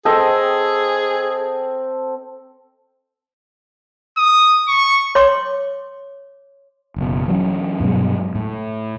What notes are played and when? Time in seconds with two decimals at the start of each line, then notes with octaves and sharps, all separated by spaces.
0.05 C4 G#4 A4 D#5 G5
4.17 D#6
4.68 C#6
5.15 C#5 C6 D6
6.96 F#1 B2
7.28 E3 F#3 C#4
7.80 G2 B2 F#3 G#3
8.35 A2